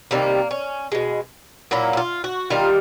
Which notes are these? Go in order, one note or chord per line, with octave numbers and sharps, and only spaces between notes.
C3 D#3 G3 A#3
C#4
B2 G#3
A#2 F#3 A#3 E4
E4
F4
F#4
D#3 G3 A#3 F4